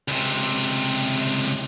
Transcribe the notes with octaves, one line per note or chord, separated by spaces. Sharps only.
C#2 C3